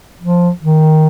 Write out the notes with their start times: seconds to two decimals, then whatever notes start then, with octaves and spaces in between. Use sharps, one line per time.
0.21 F3
0.63 D#3